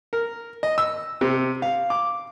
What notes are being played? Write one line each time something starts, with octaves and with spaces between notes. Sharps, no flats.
A#4
D#5
E6
C3
F5
D6